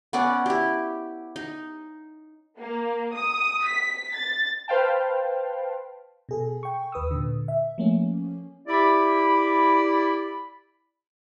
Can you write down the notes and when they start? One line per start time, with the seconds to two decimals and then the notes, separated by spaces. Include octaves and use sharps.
0.13 B3 C#4 D5 F#5
0.46 E4 G4
1.36 D#4
2.58 A#3
3.16 D#6
3.66 B6
4.14 A6
4.68 B4 C5 F5 G5 A5
6.29 B2 G#4 A4
6.63 G5 C#6
6.92 D#2 B4 D#6 E6
7.11 A#2 D3
7.48 E5
7.78 F3 A3 A#3 C#4
8.68 E4 G4 D5 B5